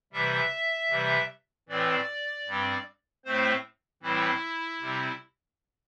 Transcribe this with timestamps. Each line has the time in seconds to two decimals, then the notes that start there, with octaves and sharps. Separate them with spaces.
0.13 C3 E3 G3 E5
0.90 C3 E3 G3
1.69 A2 E3 C4 D5
2.46 G2 G3 C4
3.25 A2 A3 C4 C5
4.03 A2 E3 G3 C4 E4
4.81 C3 G3 C4